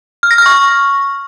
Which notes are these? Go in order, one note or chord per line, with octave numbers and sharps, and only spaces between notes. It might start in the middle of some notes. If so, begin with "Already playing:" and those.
F6
A#6
F6
C#6